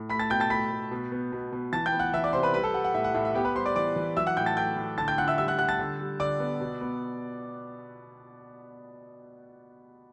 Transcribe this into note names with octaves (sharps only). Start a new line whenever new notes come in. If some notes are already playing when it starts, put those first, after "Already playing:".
Already playing: A2
A3 B5 B6
A5 A6
B2 G5 G6
A5 A6
A3 B5 B6
A3
B2
B3
B2
B2
E3 A5 A6
G5 G6
B3
F#5 F#6
E3 E5 E6
D5 D6
C3 C5 C6
B4 B5
G3 B4 B5
A4 A5
G3 F#5
F#5
A2 E5
F#5
A2 E5
E5
B3 G4 G5
B4 B5
G3 C5 C6
D5 D6
E3 D5 D6
E3
F#3 E5 E6
F#5 F#6
A2 G5 G6
A5 A6
A3 G5 G6
A2
D3 A5 A6
G5 G6
D3 F#5 F#6
E5 E6
G3 E5 E6
F#5 F#6
G3 F#5 F#6
A5 A6
D3
G3
D3 D5 D6
B3
B2
B3